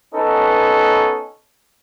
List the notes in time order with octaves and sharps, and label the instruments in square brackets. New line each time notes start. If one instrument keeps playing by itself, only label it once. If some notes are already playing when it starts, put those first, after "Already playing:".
[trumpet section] B3 C#4 D#4 A4 B4